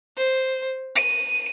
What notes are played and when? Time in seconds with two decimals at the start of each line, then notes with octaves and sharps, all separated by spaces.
0.17 C5
0.96 D#7